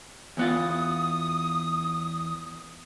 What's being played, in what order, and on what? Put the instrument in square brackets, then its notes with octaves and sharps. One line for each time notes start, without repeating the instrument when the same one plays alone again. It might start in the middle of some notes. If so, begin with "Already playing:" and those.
[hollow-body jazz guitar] E2 B3 F4 [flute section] D#6